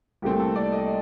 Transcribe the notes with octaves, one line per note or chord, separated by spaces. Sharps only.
C2 A#2 A3 C4 G4
A4
D5
D#5